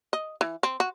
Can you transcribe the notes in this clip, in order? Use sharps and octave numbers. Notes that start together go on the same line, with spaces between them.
D#5
E3
C4
F#4